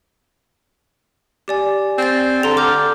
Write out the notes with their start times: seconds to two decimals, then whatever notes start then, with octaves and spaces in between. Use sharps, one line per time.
1.48 G4 D5 G#5
1.98 C4 D5 A6
2.43 D3 A#5 C6 F7
2.57 D6 F6 G6